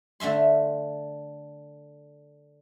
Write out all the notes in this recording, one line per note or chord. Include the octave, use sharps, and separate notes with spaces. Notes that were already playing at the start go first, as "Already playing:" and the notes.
D3 A3 E5 C6